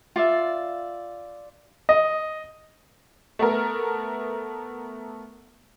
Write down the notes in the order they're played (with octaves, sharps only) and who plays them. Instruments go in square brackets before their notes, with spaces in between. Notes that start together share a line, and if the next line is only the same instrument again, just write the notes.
[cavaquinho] F4 D5 E5
[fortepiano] D#5
[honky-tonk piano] A3 B3 A#4